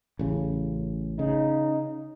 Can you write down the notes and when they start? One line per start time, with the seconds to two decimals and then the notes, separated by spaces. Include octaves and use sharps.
0.19 A1 C#3
1.19 C#3 D#4